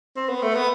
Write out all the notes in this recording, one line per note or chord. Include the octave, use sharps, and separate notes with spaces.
C4
B3
A3
B3